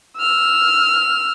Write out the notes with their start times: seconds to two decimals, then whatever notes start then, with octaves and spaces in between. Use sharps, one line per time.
0.19 E6 F6